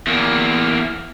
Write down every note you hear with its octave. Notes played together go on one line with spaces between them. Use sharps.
E2 A#3